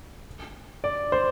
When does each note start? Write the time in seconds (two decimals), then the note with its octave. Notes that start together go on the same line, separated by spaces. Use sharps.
0.84 D5
1.12 C5